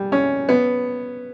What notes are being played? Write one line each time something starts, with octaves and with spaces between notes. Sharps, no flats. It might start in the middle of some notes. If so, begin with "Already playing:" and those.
Already playing: G3
C#4
B3